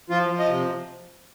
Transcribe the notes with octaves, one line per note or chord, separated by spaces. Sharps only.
F3 F4
F3
D#5
C3